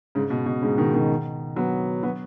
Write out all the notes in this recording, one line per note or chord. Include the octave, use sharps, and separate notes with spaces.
G#2 C#3
B2
B2
G#2 C#3
B2 D#3
B2 D#3
F#3 B3
F#3 B3